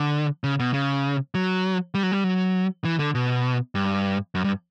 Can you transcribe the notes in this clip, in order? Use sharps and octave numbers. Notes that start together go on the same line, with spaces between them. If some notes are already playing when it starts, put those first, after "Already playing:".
Already playing: D3
C#3
B2
C#3
F#3
G3
F#3
G3
F#3
E3
D3
B2
G2
F#2
G2